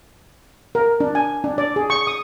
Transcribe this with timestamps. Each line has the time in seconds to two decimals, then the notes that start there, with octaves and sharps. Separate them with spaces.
0.75 A#4
1.00 D4
1.15 G#5
1.44 D4
1.58 D5
1.76 G#4
1.90 C#6
2.07 D#6